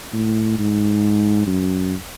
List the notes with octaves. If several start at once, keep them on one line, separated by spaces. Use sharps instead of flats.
A2
G#2
F#2